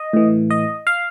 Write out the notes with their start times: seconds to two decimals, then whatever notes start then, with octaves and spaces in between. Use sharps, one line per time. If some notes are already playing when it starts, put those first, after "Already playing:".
Already playing: D#5
0.13 A2 E3
0.51 D#5
0.87 F5